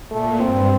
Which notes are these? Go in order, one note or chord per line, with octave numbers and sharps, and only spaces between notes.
A#2 A3
G2 C4